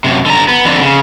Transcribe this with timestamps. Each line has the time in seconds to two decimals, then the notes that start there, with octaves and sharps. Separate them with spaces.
0.04 F#2 C3
0.26 D3 A#5
0.48 B3
0.65 F2 D3
0.81 C#3